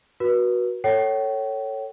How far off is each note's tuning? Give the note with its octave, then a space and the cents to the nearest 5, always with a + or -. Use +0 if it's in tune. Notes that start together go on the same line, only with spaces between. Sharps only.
F#4 +0 B4 -35
A4 +15 C#5 +0 G5 -40